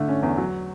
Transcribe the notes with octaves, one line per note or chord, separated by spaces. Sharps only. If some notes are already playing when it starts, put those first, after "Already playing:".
Already playing: D3 A3
C#4
E2
F#3